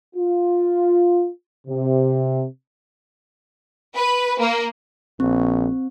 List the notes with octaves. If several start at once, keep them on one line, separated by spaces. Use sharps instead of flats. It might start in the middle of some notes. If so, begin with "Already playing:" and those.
F4
C3
B4
A#3
A#1 C4